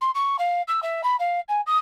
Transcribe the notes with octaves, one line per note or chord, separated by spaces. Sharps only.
C6
C#6
F5
E6
E5
B5
F5
G#5
D#6